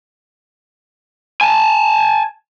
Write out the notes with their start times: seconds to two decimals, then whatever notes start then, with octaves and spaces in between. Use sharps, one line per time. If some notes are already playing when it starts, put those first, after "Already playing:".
1.41 G#5 A5